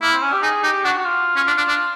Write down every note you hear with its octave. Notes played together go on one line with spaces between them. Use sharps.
A#3 E4
C4
C#4
G4
D#4 G#4
D#4 G4
D4 F#4
F#4
F4
C#4
D4
D4
D4